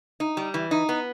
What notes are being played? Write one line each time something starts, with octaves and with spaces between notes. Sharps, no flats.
D#4
G3
E3
D#4
B3